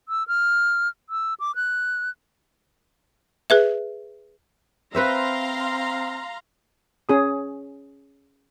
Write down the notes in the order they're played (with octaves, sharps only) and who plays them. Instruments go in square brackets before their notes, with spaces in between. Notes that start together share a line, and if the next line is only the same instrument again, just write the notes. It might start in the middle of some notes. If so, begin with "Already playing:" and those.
[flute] E6
F6
E6
D6
F#6
[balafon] G#4 B4 E5
[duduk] C4 [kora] B4 C5 E5 [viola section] F5 A#5 C6
[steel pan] C#4 G#4 D#6